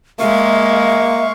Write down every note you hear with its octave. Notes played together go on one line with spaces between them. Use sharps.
G#3 A#3 E5 F5 C#6